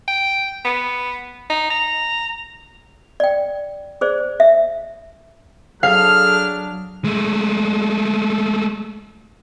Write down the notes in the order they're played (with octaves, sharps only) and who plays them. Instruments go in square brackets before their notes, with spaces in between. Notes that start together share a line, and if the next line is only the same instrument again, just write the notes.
[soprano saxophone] G5
B3
D#4
A#5
[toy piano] D5 G5
G#4 C5 D5
E5
[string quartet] F#3 D4 [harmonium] G#4 A4 [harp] F5 [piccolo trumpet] F6
[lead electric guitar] G#3 A3